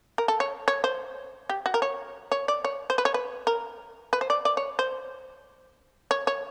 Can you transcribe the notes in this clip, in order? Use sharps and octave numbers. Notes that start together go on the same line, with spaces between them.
A#4
A4
C#5
C#5
C5
G4
F#4
A#4
C#5
C#5
D5
C#5
C5
B4
C#5
B4
A#4
B4
C5
D5
D5
C#5
C5
C#5
C#5